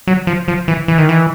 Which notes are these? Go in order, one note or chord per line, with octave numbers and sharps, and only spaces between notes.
F#3
F3
F3
E3
E3
D#3
E3